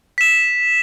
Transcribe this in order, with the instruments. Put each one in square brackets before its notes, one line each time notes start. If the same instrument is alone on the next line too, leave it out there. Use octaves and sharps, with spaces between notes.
[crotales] B6 E7